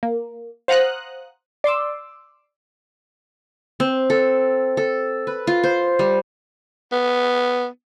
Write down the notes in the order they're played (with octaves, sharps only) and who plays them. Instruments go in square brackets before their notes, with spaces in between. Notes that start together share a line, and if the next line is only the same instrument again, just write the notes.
[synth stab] A#3
C5 F5 F#5 A#5 D#6 F#6
D5 C6 D6 E6
[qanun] C4
A4
A4
B4
F4
C5
G3
[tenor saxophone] B3